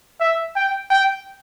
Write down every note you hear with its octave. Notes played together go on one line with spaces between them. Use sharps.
E5
G5
G5